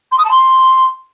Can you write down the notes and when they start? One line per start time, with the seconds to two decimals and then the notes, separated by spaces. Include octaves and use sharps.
0.12 C6
0.18 D#6
0.24 A5
0.31 C6